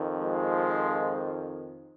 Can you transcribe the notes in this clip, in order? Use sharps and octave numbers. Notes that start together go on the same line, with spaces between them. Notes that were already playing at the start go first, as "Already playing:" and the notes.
Already playing: F2 D#3
F3 G#3